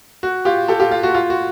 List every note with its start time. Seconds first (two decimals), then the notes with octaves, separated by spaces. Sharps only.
0.23 F#4
0.45 F4 G4
0.68 G4 A4
0.80 F4 G4
0.91 F4
1.03 F#4
1.14 F4
1.30 F#4